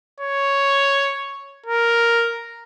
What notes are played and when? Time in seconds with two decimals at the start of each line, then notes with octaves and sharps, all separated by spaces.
0.20 C#5
1.66 A#4